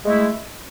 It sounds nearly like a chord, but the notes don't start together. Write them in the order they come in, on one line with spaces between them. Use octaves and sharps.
G#3 A3 E4